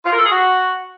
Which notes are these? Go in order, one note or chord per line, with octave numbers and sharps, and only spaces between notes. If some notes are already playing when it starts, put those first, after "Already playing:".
F4
A#4
A4
G#4
F#4